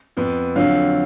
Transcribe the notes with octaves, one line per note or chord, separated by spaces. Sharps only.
F2 F3 B3
F2 D3 F#3 F5